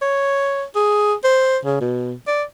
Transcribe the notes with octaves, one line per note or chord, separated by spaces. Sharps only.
C#5
G#4
C5
C#3
B2
D5